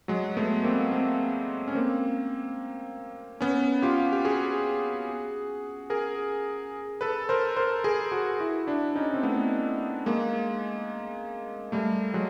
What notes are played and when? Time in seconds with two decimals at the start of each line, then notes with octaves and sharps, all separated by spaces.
0.08 F#3 G#3
0.37 A3 B3
0.64 A#3 C4
0.91 A#3 C4
1.68 C#4
1.75 A#3 C4
3.41 B3 C#4
3.82 F4 G4
4.12 G4
4.25 F#4 G#4
5.90 G#4 A#4
7.01 A4 B4
7.29 A#4 C5
7.56 A#4 C5
7.84 G#4 A#4
8.12 F#4 G#4
8.40 E4 F#4
8.67 D4 E4
8.96 C#4 D#4
9.14 C4
9.23 A3 B3
10.06 G#3 A#3
11.72 G3 A3
12.14 F#3 G#3